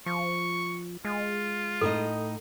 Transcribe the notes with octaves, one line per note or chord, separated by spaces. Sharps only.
F3 C#6
G#3 F4
A2 D#4 A4 D#5